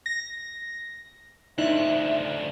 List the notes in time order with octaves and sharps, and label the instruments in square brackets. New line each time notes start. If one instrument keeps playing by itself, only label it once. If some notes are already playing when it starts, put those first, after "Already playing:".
[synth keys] A#6
[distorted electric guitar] D2 F3 [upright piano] D#4 [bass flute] E5 [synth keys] F#6